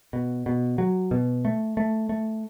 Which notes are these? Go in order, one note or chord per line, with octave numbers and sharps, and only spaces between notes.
B2
B2
F#3
B2
A3
A3
A3